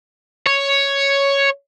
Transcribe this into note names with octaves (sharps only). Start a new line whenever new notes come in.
C#5